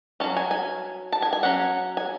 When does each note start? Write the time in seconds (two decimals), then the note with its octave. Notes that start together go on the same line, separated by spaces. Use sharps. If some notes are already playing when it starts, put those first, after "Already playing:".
0.20 C#4 A5
0.24 F#3
0.37 G#5
0.51 G#5
1.12 A5
1.22 G#5
1.33 G#5
1.43 F#3 C#4 F#5
1.97 G#5